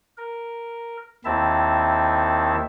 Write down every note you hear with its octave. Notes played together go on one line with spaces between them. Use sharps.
A#4
D#2 D#3 C4 E4 E5 A5